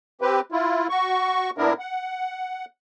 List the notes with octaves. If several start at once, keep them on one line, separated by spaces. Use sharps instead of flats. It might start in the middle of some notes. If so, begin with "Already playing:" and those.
C4 G4 B4
E4 F4
F#4 C#6
A#2 B3 D4 E4 A#4
F#5